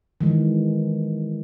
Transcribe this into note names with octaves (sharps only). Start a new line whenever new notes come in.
D#3 E3 G#3